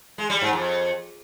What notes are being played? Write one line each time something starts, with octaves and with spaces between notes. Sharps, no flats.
G#3
G3
G#2
F2